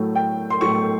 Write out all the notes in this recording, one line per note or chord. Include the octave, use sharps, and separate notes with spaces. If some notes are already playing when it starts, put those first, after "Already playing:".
Already playing: A2 F#3 A3
G5
C6
A2 F#3 A3 C#6